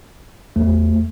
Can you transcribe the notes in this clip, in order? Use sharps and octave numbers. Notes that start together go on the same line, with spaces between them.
E2 A3